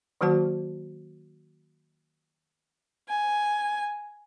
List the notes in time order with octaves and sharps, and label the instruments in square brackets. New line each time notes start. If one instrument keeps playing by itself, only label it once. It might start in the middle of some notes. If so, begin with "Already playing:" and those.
[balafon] D#3 F#3 A#3 F#4 C5 A5
[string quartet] G#5